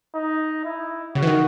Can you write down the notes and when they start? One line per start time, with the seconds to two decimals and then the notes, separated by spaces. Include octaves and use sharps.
0.15 D#4
0.65 E4
1.15 C#3 F#4
1.23 E3
1.27 D#3